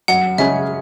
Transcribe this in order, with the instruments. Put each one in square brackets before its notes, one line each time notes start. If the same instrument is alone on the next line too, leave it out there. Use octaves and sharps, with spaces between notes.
[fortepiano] F#2 [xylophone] F#5
[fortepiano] C#3 G#3 C#4 G#4 [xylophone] E5